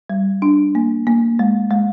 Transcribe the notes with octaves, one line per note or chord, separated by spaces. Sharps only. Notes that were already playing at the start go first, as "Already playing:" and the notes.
G3
D4
A#3
A#3
G#3
G#3